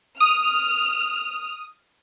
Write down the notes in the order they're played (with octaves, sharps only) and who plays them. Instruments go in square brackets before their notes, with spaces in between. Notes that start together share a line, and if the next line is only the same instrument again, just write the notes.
[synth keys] D#6 [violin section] F6